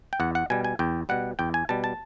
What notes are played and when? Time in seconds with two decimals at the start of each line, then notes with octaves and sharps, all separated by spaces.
0.13 G5
0.20 E2 F#5
0.35 F#5
0.50 B2 G3 G#5
0.64 G#5
0.79 E2 G5
1.09 B2 G3 F#5
1.39 E2 G5
1.54 G#5
1.69 B2 G3 A5
1.84 A5